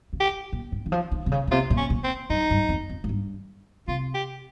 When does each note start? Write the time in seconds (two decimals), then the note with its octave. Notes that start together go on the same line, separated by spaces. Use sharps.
0.13 C#3
0.20 G4
0.53 A#2
0.72 G#2
0.86 D#3
0.92 F3
1.12 D#3
1.26 C3
1.32 C#3
1.47 A#2
1.51 C3 F4
1.70 A#2
1.77 C#4
1.90 A#2
2.04 C4
2.30 G2 D#4
2.50 G2
2.69 F2
2.89 F2
3.04 G#2
3.09 G2
3.88 C3 F4
4.14 G4